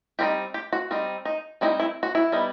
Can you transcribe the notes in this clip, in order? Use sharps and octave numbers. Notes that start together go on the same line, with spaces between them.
G3 C4 D#4 G4
G4
F#4
G3 C4 D#4
D#4
G3 C4 D#4 E4
E4
F#4
E4
G3 B3 D#4